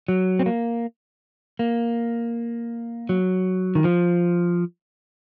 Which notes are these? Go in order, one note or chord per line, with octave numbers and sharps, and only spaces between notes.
F#3
C4
A#3
A#3
F#3
D#3
F3